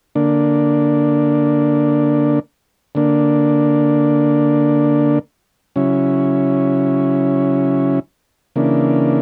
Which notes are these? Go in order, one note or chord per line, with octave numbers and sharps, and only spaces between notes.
D3 A#3 D4
D3 A#3 D4
C#3 F#3 C#4 E4
C#3 E3 A#3 D4